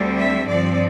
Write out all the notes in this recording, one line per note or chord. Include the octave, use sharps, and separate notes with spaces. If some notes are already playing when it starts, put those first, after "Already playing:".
Already playing: D2 D3 G3 C4
E5
G2 F3 C4 D5